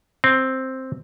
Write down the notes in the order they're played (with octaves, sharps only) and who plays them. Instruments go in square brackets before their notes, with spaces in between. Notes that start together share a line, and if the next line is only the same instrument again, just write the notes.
[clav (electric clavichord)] C4